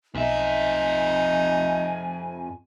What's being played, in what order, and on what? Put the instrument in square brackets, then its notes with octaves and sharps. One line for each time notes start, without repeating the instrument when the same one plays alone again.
[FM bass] B1 [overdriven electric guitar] F2 E5 [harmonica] D#4 [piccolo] G#5